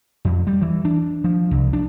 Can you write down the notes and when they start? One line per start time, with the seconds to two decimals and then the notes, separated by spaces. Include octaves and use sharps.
0.25 F2
0.47 G3
0.62 E3
0.85 D4
1.24 F3
1.51 C2
1.73 D4